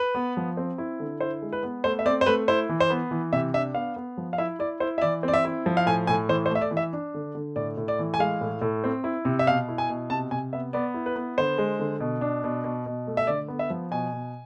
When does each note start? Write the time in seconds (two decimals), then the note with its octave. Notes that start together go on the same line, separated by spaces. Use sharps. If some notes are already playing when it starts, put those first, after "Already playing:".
Already playing: B4
0.15 B3
0.37 F3
0.57 C4
0.78 E4
1.00 D3
1.20 E4 C5
1.42 G#3
1.53 B4
1.63 B3
1.84 A3 C5
1.99 E5
2.06 C4 D5
2.21 C5
2.26 A3 B4
2.48 E4 C5
2.69 E3
2.80 C5
2.90 B3
3.11 E3
3.33 C3 E5
3.54 D4 E5
3.75 B3 F5
3.96 B3
4.17 F3
4.33 F5
4.38 E4 E5
4.59 E4 D5
4.80 E4 C5
4.98 E5
5.02 E3 D5
5.23 C4 D5
5.34 E5
5.45 E4
5.66 F3
5.77 F5
5.86 A2 G#5
6.07 A2 G#5
6.29 E3 C5
6.46 C5
6.51 A3 E5
6.61 D5
6.71 E3
6.77 E5
6.93 D4
7.14 D3
7.35 D3
7.56 A2 D5
7.77 A2
7.88 D5
7.99 E3
8.14 G#5
8.19 G#3 F5
8.41 A2
8.61 A2
8.84 C4
9.04 E4
9.25 C3
9.39 E5
9.47 B2 F5
9.68 E4
9.78 G#5
9.89 B2
10.10 C3 A5
10.31 C3 G#5
10.53 B3 E5
10.73 B3 D5
10.94 E4
11.06 B4
11.16 B3
11.38 D3 C5
11.58 G#3
11.80 D3
12.00 B2
12.21 D4
12.44 B2
12.64 B2
12.86 B2
13.07 A3
13.17 E5
13.27 D3 D5
13.48 B3
13.59 E5
13.70 F3
13.91 B2 G#5
14.13 B2